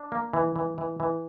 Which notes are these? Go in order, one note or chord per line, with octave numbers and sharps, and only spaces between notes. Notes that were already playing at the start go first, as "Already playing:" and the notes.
Already playing: D4
A#3
E3
E3
E3
E3